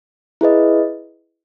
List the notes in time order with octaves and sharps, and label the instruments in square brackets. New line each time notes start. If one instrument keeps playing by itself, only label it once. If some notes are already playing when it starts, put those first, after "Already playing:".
[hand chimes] E4 G#4 B4 D#5